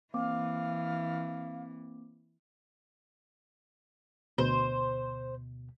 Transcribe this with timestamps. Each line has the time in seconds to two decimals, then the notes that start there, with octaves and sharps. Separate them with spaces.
0.14 E3 A#3 C4 F5 D6
4.38 D2 B2 C5